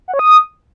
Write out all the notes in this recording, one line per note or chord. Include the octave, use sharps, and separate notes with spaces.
F#5
C#5
D#6